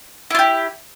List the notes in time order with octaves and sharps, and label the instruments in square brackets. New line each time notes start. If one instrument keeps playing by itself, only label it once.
[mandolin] E4
F4
G4